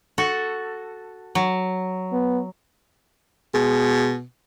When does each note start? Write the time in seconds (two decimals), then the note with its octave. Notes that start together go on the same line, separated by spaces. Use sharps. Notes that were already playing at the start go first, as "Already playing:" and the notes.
0.18 F#4 A4
1.35 F#3
2.12 B3
3.54 B2 G#3